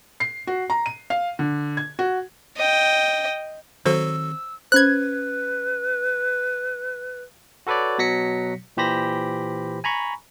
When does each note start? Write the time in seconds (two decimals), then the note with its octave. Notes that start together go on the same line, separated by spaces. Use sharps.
0.20 C7
0.47 F#4
0.70 A#5
0.86 D#7
1.10 F5
1.39 D3
1.77 G#6
1.99 F#4
2.57 D#5 G5
3.86 D#3 F#3 C4 F#4 A4 C5 E6
4.72 C#4 B4 C5 F#6 G#6
7.67 F#4 A4 B4 C#5 D5
7.98 B2 F#3 A#6 B6 C#7
8.77 A#2 E3 G4 C5 B5 A#6
9.84 G#5 A#5 B5 C#6